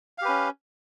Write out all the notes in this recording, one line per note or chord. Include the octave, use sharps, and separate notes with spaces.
C#4 G4 B4 F5